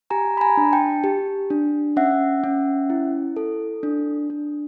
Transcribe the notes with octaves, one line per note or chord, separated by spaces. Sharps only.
G4 G#5 A#5
B5
G#5 A#5
D4
G5 A5
G4
D4
C#4 E5 F#5
C#4
E4
A4
D4
D4